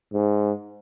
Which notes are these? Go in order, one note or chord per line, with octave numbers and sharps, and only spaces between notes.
G#2